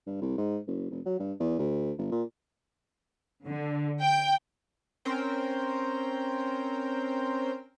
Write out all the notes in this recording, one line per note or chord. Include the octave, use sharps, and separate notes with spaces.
G2
C2
G#2
F#1
F1
F#3
G2
E2
D2
G1
A#2
D3
G5
C4 C#4 A#4 C5 G5